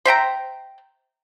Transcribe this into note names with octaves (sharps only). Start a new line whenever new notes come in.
C5 E5 G5 A#5